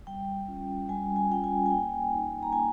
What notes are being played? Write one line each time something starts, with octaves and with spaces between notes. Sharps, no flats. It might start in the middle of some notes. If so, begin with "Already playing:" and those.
G3 G5
C#4 F4
G3 G#5
G#5
C#4 F4 G5
G#5
G#5
A#3 G5
D#4
A#5
A#3 G#5